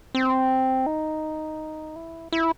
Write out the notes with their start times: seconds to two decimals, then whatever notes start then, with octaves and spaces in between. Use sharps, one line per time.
0.15 C4
0.86 D#4
1.96 E4
2.32 E4